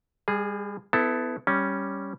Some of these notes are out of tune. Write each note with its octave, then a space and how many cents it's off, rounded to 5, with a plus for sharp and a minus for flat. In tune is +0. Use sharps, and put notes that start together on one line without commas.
G3 +35 G#4 +0
B3 +25 E4 +0 A4 +0
G3 +0 C#4 +0